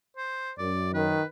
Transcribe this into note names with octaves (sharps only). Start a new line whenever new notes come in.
C5
F#2 D5
D#3 B4